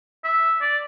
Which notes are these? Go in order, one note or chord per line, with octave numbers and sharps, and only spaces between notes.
E5
D5